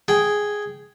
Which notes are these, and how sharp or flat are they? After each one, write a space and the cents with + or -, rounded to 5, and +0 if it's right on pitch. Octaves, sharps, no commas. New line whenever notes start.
G#4 +0 G5 -15